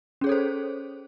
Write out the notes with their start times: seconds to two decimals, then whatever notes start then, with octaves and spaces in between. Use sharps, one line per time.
0.21 C#4
0.24 G#4
0.27 C#5
0.29 A4
0.32 C5